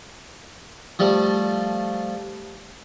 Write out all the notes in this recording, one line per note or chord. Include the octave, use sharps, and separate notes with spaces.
F3 G3 A3